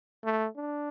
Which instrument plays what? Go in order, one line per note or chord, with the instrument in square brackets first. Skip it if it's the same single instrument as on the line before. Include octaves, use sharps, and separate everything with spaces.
[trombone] A3
D4